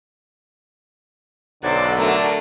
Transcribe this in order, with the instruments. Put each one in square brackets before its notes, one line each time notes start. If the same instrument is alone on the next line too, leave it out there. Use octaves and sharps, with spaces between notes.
[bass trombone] B1 [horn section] D3 F#3 [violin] C5 D5
[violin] A3 D4 [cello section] F#4 A#4